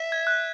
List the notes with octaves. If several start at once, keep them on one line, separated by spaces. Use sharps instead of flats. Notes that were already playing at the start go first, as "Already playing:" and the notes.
Already playing: E5
G#6
F#6